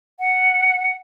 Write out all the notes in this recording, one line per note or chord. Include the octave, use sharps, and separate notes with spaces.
F#5